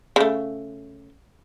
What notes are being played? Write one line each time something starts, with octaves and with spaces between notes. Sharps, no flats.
C#3 A3